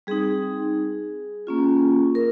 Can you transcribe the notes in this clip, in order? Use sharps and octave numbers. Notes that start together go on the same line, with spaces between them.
G3 C4 D#4 G#4
A#3 C#4 F4
A#4